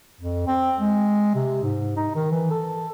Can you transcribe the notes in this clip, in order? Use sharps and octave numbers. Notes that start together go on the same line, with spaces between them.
F2
C4
G#3
C3
G#2
D#4
D#3
E3
A4